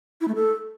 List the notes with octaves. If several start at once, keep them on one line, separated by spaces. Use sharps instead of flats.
E4
A3
A4